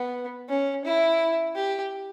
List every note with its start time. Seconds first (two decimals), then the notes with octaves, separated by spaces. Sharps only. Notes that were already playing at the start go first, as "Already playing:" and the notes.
Already playing: B3
0.49 C#4
0.84 E4
1.56 G4